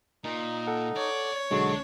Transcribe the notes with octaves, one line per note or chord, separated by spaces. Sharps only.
A#2 D#4
A4 F#5
C#5 D5
B1 D3 F#3 G#3 D4 F#4